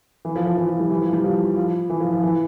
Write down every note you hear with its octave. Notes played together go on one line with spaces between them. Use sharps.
E3
F3
F3
E3
F3
G3
E3
F3
G3
F3
F3
E3
F3
F3
E3